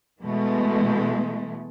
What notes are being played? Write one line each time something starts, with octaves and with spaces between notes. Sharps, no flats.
B2 E3 G#3 A3